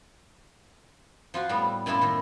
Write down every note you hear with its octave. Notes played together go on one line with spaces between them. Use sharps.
F3 F4 F#4
A2 G3 B3
F#2 A2 A3 E4 F4
A2 D#3